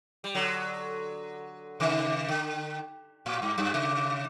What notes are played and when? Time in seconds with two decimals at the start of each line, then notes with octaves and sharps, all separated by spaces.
0.24 G3
0.35 D3 F#3
1.80 C3 D#3
2.29 D3
3.26 A2
3.42 G2
3.58 F#2
3.74 C3